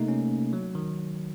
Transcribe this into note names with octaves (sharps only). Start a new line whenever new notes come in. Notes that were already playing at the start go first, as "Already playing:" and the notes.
Already playing: C3 A3 A#3 D#4
C#4
F#3
D#3